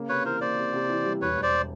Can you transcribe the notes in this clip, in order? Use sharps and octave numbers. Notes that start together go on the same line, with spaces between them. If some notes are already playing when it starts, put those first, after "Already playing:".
Already playing: C#3 A#3
C3 B4 C#5
E3 A#4 C5
A#3 C5 D5
C3
C3
E3
G3
E1 B4 C#5
E1
C5 D5